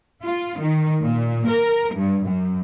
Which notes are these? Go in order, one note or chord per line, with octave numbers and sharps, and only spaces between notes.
F4
D#3
A#2
A#4
G2
F#2